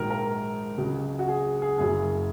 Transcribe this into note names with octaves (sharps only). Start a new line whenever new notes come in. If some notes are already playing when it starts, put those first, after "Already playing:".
Already playing: A#1 G#2 D#3 F#3 A#4
A#4
C#2 C#3 F#3
F#4
G#4
G#4
F#1 F#2 C#3 F#3 G#4